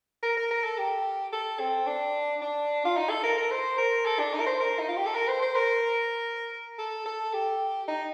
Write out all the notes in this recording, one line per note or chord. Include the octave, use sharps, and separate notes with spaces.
A#4
A#4
A#4
A4
G4
A4
C4
D4
D4
F4
D#4
A4
A#4
A#4
C5
A#4
A4
D4
D#4
A#4
C5
A#4
D#4
F4
G4
A4
A#4
C5
C5
A#4
A4
A4
G4
D#4